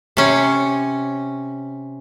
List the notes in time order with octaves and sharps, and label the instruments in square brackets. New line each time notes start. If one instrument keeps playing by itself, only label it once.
[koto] C3 C#4